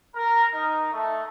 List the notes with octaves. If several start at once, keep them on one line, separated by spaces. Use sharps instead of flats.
A#4
D#4
A3